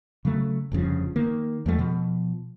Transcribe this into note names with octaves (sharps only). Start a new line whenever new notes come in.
C#3 F#3 A3
F1 G2 C#3 F3
D#3 A#3
E2 F3 G#3 A3
B2 F3